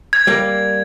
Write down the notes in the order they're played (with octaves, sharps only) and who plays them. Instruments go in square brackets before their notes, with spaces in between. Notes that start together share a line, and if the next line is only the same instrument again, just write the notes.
[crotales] G#6
[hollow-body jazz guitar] G3 A#3